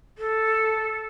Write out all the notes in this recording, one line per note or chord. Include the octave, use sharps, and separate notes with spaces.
A4